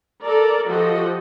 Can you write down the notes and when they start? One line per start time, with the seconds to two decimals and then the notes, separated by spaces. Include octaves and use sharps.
0.23 A4 A#4 D5
0.67 F3 F#4 G4 A4 D#5